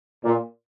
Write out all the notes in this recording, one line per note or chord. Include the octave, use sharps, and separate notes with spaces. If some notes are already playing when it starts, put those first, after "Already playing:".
A#2